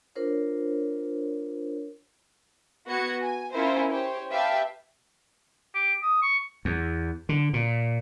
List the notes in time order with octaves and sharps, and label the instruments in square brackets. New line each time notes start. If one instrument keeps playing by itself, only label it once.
[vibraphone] D4 F4 A#4 C5 C#5
[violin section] B3 F#4 G#6 C#7
G#5
C#4 E4 F4 A#4 C5
G4 C5 C#5
G4 B4 E5 F5 G5 A5
[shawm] G4
D#6
C#6
[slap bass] E2
D3
A#2